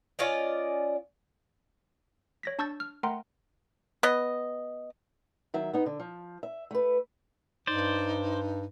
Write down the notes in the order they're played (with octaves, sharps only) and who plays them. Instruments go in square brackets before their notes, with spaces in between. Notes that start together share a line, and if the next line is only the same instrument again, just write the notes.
[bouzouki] C#4 F4 D5 D#5
[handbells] C#5 A#6 B6
D4 A5 C#6 E6 G6 A6
F6
A3 A#4 F#5 G5 A#5 C6
[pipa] B3 D#5
[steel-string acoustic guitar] D#3 F#3 E5
B3 D#4
D3
F3
E5
A3 B4
[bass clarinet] G2 [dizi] D#4 [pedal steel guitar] C5 D5